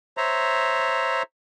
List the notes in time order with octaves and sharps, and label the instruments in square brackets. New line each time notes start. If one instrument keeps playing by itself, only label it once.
[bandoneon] C5 C#5 E5 A#5